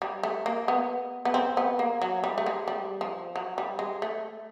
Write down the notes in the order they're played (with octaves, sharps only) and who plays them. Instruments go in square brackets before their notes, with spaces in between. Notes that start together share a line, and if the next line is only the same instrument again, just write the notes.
[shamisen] G3
A3
A#3
B3
B3
C4
B3
A#3
F#3
G3
A3
G#3
G3
F3
F#3
G3
G#3
A3